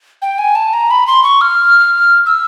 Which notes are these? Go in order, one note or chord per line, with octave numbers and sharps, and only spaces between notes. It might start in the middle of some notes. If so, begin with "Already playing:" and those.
G5
G#5
A5
A#5
B5
C6
C#6
F6
E6